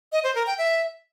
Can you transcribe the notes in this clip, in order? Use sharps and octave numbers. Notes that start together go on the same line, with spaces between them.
D#5
C5
A#4
G5
E5